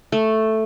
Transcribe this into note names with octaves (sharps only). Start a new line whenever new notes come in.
A3